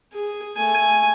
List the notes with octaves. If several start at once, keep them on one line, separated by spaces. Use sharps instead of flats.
G#4
A3 G#5